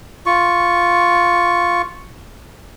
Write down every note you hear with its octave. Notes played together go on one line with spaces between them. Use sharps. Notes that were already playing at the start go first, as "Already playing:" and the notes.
F4 C#6